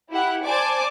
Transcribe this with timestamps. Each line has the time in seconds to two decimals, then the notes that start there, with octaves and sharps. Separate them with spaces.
0.12 E4 G4 F#5
0.44 C5 D5 G#5 A5 D6